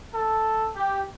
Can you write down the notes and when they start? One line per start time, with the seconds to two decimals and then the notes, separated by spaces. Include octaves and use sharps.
0.14 A4
0.76 G4